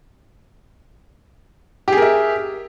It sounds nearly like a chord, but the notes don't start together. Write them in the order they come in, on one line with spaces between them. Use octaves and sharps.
G4 G#4 A#4 E5